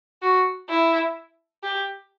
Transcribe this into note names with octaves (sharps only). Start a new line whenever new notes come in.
F#4
E4
G4